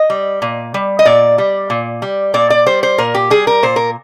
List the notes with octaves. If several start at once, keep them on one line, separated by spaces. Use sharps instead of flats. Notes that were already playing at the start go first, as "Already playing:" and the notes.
Already playing: D#5
G3
A#2
G3
D#5
A#2 D5
G3
A#2
G3
A#2 D5
D5
G3 C5
C5
A#2 A#4
G4
G3 G#4
A#4
A#2 C5
A#4